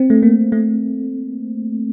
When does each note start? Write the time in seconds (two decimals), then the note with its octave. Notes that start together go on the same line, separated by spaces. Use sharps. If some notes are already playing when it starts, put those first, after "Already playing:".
Already playing: C4
0.10 A3
0.23 A#3
0.52 A3